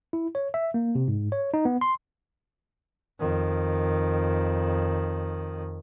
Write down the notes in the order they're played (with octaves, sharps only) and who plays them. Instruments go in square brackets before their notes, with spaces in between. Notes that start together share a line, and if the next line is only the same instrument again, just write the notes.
[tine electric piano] E4
C#5
E5
A#3
C3
G#2
C#5
D#4
B3
C6
[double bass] F2 D#3